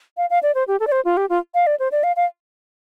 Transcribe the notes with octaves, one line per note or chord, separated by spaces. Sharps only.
F5
F5
D5
C5
G4
A4
D5
C5
F4
G4
F4
F5
D5
C5
D5
F5
F5